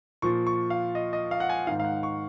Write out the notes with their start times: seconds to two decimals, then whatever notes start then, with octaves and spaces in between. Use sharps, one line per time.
0.22 A#2 F3 C#6
0.47 C#6
0.70 F5
0.95 D#5
1.13 D#5
1.31 F5
1.40 F#5
1.50 G#5
1.67 D#3 F5
1.71 G#2
1.80 F5
1.85 F#5
2.03 C#6